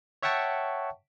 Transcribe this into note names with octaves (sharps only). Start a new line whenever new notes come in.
C#5 E5 F#5 G5 A5 C#6